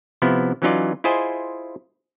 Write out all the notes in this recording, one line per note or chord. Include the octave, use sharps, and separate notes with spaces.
C3 F3 B3 E4
E3 F#3 C#4 D#4 F4 D5
E4 F4 G#4 C5 D#5 G#5